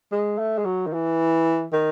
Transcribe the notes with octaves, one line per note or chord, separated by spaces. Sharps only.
G#3
A3
G#3
F#3
D#3
E3
D#3